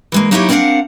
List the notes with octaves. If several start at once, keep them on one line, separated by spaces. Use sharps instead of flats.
E3 G#3 A#3
F#3 A#3 D#4 E4 G4 C#5
C4 D4 A#4 C#5 F5 F#5